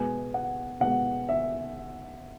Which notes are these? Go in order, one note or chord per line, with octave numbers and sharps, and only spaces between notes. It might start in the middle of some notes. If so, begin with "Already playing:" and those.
Already playing: B2 G#3 B3 G#5
F#5
B2 G#3 B3 F#5
E5